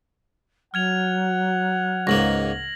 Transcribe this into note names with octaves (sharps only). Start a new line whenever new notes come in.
F#3 F#5 F6 G#6 F7
C#2 G#2 A#3 A#6 F#7